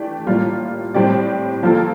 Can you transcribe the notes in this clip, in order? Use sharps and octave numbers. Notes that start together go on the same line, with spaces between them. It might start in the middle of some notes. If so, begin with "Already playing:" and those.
Already playing: E3 A3 D4 G4
A2 G3 A#3 F4
A2 G3 C4 G4 D5
F3 A#3 F4 A4